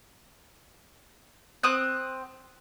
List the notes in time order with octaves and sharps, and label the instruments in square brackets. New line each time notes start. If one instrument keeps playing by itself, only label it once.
[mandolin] C4 D#6 F#6